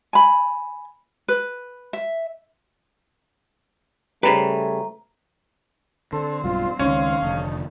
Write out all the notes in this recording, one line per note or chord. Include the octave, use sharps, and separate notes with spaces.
G#5 B5
B4
E5
C#3 G3 A3 B4 C5 A#5
D3 C4 A4 C5
B1 G2 B2 F4
C#2 D#3 C#4 F5
F1 D3 D#3 A3